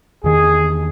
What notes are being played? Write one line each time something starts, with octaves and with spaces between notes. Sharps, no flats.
E2 D#3 G#4